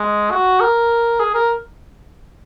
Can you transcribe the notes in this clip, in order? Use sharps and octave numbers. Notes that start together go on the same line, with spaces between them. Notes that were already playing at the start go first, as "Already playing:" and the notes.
Already playing: G#3
F#4
A#4
G#4
A#4